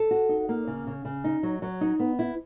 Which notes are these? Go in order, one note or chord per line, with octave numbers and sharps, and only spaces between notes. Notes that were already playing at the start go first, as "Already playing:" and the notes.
Already playing: A4
F#4
D#4
A#3
C#3
C#3
C#3
D#4
F#3
F#3
D#4
B3
E4